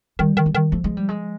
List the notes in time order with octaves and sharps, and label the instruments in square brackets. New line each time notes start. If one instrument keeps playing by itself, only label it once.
[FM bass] D#3 [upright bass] G3
[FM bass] D#3
[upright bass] G3
[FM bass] D#3
[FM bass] F3 [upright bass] A3
[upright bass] G#3
G3
G#3